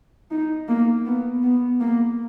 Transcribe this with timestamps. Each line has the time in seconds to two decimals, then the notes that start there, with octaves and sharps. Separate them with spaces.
0.31 D#4
0.69 A#3
1.06 B3
1.43 B3
1.81 A#3